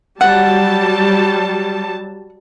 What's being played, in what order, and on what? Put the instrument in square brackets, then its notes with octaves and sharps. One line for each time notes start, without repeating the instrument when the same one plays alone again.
[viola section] F#3 G3 A5 [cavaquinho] F#5